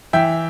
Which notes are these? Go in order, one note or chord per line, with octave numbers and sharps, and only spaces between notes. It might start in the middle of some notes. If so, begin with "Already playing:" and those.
E3 E5 G5